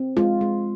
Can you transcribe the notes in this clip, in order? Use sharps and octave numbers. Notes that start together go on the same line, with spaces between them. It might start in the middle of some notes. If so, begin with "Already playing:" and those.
Already playing: C4
G#3 F4
G#3